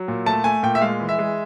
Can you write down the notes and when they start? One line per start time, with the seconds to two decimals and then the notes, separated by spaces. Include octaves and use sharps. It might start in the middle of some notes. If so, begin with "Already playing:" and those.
Already playing: F#3
0.08 A#2
0.26 A3 A5
0.44 A3 G#5
0.63 A#2 G5
0.75 E5
0.81 G#3 F5
1.00 E3
1.09 E5
1.19 G#3